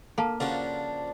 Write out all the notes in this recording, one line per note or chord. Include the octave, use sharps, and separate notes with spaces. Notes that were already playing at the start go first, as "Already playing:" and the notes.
A#3 A4 F5 A5
C#3 F3 D4 F4 F#4